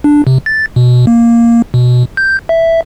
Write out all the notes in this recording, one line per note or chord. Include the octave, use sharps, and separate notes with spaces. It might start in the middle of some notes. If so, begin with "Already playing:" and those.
D4
C3
A6
B2
A#3
B2
G6
E5